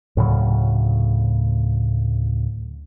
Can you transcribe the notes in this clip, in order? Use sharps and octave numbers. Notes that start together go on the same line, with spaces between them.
D2 A2 C#3 F#3